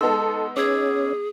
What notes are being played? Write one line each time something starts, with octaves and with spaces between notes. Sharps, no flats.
G#3 B3 D#4 A4 C6 E6
C#4 G#4 D6 E6 G#6